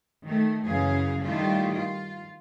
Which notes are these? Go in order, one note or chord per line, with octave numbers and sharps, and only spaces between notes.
D#3 A3
F#2 C#3 E3 G#4 F5
D#3 G3 A3 E4 F4
F4